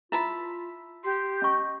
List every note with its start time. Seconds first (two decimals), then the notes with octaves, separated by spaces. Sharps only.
0.12 E4 F4 E5 A5 B5
1.04 G4 C6
1.42 C#4 D#5 C#6